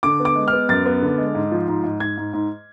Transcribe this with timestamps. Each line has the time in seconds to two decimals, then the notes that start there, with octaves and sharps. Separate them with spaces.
0.03 D3 D6
0.20 B3
0.25 D6
0.36 G#3
0.48 F6
0.53 B3
0.69 F#2 A6
0.86 B3
1.02 D3
1.18 G#3
1.35 G#2
1.52 F3
1.68 G#2
1.84 G#2
2.00 G#2 G#6
2.18 G#2
2.33 G#2